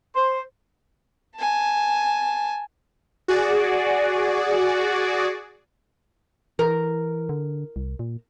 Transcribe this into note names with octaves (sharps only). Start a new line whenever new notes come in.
C5
G#5 A5
F#4 G#4 D5
E3 A#4
D3
C2
A#2